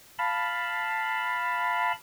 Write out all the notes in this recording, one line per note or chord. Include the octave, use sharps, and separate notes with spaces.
F5 A5 B5